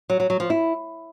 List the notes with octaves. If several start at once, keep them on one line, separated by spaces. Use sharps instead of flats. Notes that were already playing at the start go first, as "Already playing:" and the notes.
F#3
F#3
F#3
F3
E4